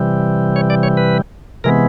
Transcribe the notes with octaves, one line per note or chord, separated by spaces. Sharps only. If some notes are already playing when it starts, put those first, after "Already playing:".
Already playing: C3 E3 G3
C#5
D5
C#5
B4
C3 E3 G#3 B3 A#4